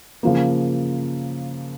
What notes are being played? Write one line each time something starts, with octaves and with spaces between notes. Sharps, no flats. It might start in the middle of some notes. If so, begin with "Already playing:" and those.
C#3 F3 A#3